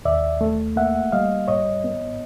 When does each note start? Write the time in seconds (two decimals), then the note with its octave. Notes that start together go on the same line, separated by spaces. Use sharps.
0.05 D#2 D5 E5
0.41 A3
0.76 A#3 E5 F#5
1.12 G3 D#5 F5
1.48 G#2 C#5 D#5
1.84 B3